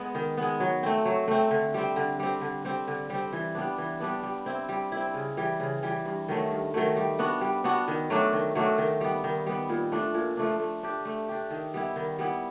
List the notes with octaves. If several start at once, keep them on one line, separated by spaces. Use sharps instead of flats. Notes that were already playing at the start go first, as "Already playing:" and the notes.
Already playing: G#3 B3
D#3
G#3 B3
F#3
A3 C4
F#3
A3 C4
D3
G3 C4
D3
G3 C4
D3
G3 C4
D3
G3 C4
E3
G3 B3 D4
E3
G3 B3 D4
G3
C4 E4
G3
C4 E4
C#3
E3 G3
C#3
E3 G3
G2
D#3 F#3 A3
G2
D#3 F#3 A3
G3
B3 D4 F#4
G3
B3 D4 F#4
D#3
F#3 A3 D4
D#3
F#3 A3 D4
D#3
G3 B3
D#3
G3 B3
A#2
F3 A3 D4
A#2
F3 A3 D4
A3
D4 G4
A3
D4 G4
D#3
G3 B3 E4
D#3
G3 B3 E4